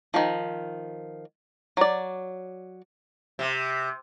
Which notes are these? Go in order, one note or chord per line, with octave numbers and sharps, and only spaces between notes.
D#3 F3
F#3 D5
C3